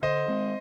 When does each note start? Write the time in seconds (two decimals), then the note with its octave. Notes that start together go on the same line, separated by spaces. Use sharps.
0.02 D3 C5 D#5
0.28 G#3 C4